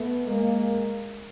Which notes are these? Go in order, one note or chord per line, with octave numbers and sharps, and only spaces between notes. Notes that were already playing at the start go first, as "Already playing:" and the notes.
Already playing: A3 B3
G#3 A#3